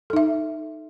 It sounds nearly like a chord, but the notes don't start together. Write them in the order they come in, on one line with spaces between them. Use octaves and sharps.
A4 D#4 E5